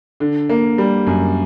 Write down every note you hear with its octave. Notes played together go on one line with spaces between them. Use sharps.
D3
A#3
G3
F#2